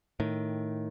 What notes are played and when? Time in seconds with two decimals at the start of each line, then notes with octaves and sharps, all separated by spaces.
0.20 A2 D#3